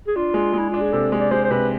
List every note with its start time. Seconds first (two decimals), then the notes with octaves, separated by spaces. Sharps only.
0.07 G#4
0.16 D4 F4
0.34 G#3
0.53 G#3
0.59 E4
0.70 D4 F4
0.81 G#4
0.92 C3 A4
1.12 G#3
1.20 D5
1.31 G#3 C5
1.45 C5
1.51 C3 B4